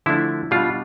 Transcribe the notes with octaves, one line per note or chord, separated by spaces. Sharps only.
D3 F3 A3 D4 E4
B2 G3 D4 F4